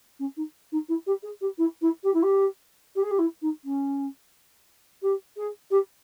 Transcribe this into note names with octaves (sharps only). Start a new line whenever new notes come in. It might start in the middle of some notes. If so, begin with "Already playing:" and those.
C#4
D#4
D#4
E4
G4
G#4
G4
E4
E4
G4
E4
G4
G4
G#4
G4
E4
D#4
C#4
G4
G#4
G4